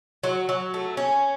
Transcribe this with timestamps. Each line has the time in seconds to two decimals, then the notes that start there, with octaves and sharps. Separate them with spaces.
0.24 F#3
0.49 F#3
0.74 A3
0.97 C#4